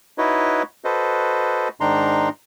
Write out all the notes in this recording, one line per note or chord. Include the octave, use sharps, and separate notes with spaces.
D#4 E4 F#4 B4 C#5 D#5
F#4 A4 B4 C5 D#5
G#2 D#3 D4 D#4 A#5 C6